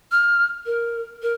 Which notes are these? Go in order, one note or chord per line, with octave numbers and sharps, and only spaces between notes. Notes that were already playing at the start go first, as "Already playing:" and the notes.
F6
A#4
A#4